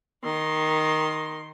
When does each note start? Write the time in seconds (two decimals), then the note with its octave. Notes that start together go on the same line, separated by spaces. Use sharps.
0.23 D#3 C6